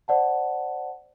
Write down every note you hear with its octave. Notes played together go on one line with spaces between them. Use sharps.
C5 D5 F#5 A5